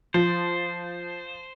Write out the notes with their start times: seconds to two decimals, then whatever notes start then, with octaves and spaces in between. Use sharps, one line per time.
0.14 F3 C5